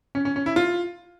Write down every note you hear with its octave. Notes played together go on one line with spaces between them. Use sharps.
C#4
C#4
C#4
E4
F4